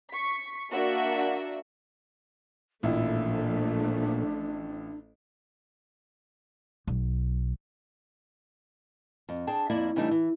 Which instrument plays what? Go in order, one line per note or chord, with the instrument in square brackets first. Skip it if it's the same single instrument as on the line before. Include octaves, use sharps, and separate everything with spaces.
[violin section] C#6 B6
A#3 D4 F#4 D5 E5
[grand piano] A1 E4 F4 [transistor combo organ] A#2 [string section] F3 A3 [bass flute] D4
[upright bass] B1
[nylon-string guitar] F2
D4 G#4 G5 A5
F2 A#3 E4 D5
C#3 E3 G3 A3 D4 D#4
E3